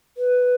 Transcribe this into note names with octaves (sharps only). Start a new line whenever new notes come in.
B4